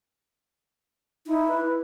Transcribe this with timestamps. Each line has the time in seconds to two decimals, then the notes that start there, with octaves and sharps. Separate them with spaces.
1.27 D#4 E4
1.48 B4